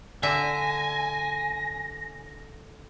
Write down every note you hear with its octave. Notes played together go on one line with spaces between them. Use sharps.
D3 E5 G#5 A#6